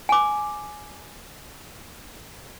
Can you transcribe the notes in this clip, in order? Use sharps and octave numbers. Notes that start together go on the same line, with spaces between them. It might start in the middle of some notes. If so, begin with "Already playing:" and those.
G#5 D6